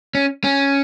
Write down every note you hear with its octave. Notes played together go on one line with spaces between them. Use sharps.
C#4
C#4